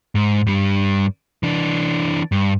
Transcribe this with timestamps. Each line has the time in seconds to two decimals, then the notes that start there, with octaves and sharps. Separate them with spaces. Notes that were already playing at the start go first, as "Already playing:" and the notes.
0.15 G#2
0.47 G2 G3
1.43 E3 D4
2.32 G2